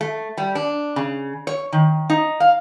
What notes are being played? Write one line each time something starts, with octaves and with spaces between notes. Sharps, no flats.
A3
G3
D4
C#3
C#5
D#3
D#4
F5